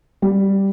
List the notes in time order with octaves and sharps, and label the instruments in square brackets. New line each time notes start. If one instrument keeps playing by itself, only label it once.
[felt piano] G3